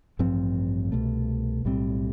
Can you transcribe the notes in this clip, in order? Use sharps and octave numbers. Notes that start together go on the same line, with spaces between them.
A1 G2 F3 C4
C2 B2 A3
B1 A2 G3 C4